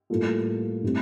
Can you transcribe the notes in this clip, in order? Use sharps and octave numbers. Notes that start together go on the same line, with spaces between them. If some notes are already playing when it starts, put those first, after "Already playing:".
A2 G3 A#3 F4 A4
A2 G3 C4